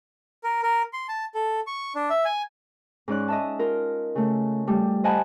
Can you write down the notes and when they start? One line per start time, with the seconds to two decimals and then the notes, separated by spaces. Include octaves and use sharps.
0.44 A#4
0.63 A#4
0.93 C6
1.09 A5
1.35 A4
1.67 C#6
1.95 D4
2.10 E5
2.25 G#5
3.08 G#2 C#4 D5 F#6
3.28 D#5 E5 A5
3.59 F4 A#4
4.15 C#3 A3
4.67 G3 A3
5.04 C5 D#5 F#5 G#5 A5 B5